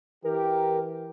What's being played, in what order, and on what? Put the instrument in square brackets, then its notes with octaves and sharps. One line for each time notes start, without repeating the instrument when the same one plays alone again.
[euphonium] E3 [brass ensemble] G4 [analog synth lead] A#4